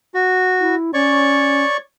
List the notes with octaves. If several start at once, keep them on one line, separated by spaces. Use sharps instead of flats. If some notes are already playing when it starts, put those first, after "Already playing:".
F#4
E4
C#4 C#5 D5 C#6